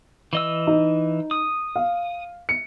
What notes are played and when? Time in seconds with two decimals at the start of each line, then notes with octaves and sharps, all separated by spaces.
0.33 E3 D#5 E6
0.67 D#4
1.31 D#6
1.76 F5
2.49 C#7